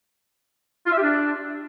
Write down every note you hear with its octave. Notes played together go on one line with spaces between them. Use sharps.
F4
E5
G4
D4